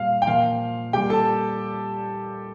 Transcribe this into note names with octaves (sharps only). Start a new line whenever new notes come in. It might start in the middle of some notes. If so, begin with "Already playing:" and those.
Already playing: A#2 G3 F5
G5
A#2 F3 F5
A#2 G3 G4 G5
A4 A5